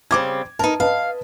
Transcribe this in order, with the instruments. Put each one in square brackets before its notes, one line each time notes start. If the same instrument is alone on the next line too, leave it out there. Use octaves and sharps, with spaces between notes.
[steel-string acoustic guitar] C#3 G3 C4 [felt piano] D6 G#6
[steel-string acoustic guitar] D#4 A#4 [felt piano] B4 A5
[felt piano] B4 D#5 A5 [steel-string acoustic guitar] F5